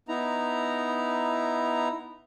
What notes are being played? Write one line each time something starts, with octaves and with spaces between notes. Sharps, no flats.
B3 D#4 E4 A#5